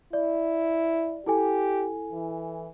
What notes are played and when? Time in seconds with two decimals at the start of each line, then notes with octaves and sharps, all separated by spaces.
0.13 E4 D5
1.26 E4 G4 A4 G#5
2.13 E3